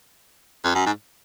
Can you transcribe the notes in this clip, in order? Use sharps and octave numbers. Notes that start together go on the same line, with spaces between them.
F2
F#2
G#2